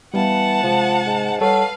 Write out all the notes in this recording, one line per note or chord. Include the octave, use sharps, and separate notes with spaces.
E3 G3 B3 F5 F#5 A5
C3 F3 G#3
G#2
G3 A4 B4 C#5 F5 F#5